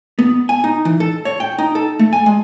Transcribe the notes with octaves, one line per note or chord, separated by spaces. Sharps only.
B3
G#5
D#4
E3
A4
C#5
G5
D#4
A4
A3
G#5
G#3